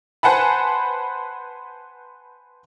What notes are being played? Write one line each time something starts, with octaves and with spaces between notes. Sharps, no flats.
B4 C5 F#5 G#5 A5 B5